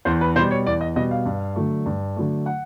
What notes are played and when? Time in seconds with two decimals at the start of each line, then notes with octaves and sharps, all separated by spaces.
0.05 E2 C5
0.21 B4
0.36 B2 C5
0.39 G3
0.51 C#5
0.66 E2 D5
0.81 D#5
0.96 B2 G3 D#5
1.11 F5
1.26 G2
1.56 D3 F#3 A3
1.86 G2
2.16 D3 F#3 A3
2.46 F#5